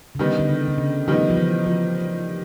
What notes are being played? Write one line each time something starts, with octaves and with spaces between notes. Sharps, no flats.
C#3
D3 D#3 G3 B3 D#4
D3
C#3
D3
C#3
D#3 F3 G3 B3 D#4
F3
E3
F3